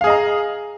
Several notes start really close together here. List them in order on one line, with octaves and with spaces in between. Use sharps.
F5 G#4 D#5 A#5